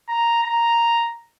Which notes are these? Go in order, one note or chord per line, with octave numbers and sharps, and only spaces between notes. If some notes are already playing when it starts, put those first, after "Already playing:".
A#5
A#5